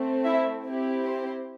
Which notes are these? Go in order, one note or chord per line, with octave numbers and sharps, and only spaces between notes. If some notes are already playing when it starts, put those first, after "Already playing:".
Already playing: A3 C4
E4 E5
C4 E4 G4
C5